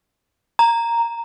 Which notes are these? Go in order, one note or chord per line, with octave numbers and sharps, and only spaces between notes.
A#5